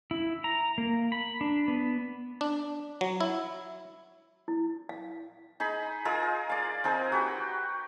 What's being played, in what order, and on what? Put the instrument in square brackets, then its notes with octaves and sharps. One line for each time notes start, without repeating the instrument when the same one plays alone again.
[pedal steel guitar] E4
A#5
A#3
B5
D4
B3
[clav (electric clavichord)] D4
F#3
E4
[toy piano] E4
F5
[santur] D#4 G#4 B5
F4 G#4 A#4 D#5
D5 F5
C4 D#4 G#4 A#4
F#4 G4 B4